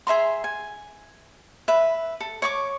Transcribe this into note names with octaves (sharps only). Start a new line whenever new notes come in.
G#4 E5 A#5 C6
G#5
B4 E5
A4
C#5 C#6 D6